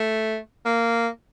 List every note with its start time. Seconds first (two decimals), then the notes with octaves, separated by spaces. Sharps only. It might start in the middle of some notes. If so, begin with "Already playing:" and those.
Already playing: A3
0.65 A#3